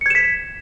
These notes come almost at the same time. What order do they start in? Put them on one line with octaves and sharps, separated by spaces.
C#7 G#6 E7 B6